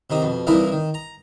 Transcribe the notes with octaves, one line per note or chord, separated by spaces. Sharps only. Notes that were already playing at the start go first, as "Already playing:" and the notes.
C3 D#3 D#4
F2 B2
C2 A#2 E3 D#4 E4 A#4
D#3
A#5